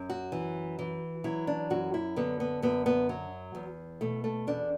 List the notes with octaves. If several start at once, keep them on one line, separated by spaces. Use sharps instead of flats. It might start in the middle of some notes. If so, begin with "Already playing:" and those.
Already playing: F#2
F#4
E3
E3
F#3 E4
D4
F#2 F#4
E4
D3 B3
B3
F#2 B3
B3
F#3
E2
B2 A3
A3
E2 D4